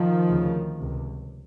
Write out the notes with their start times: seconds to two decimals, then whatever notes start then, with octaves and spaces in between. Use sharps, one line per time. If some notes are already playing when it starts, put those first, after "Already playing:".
Already playing: D#3 F3
0.28 D2 C#3
0.77 C3
0.82 C#2